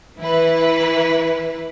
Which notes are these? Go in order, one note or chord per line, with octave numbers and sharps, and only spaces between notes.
E3 E4 B4